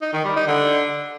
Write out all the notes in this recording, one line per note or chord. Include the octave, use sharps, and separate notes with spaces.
D#4
D#3
G3
D#4
D3